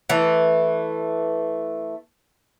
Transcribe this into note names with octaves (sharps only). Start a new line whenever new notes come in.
E3 A3